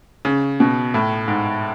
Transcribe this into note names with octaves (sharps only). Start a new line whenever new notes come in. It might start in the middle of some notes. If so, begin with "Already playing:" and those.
C#3
B2
A2
G#2